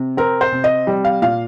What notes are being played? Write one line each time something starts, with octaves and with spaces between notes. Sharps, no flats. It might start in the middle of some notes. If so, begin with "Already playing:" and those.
Already playing: C3
C4 A#4
C5
C3
D#5
G3
F5
A#2 F5